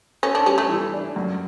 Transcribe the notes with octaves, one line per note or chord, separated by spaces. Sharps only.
C#4 A4
D4
G3 C#4
A3
E3
D4
F#2